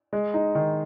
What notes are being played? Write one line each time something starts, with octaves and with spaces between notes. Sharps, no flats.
G#3
D#4
D#3